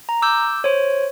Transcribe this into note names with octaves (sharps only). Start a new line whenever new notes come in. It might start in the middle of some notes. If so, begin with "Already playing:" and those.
A#5
D6 E6 G6
C5 C#5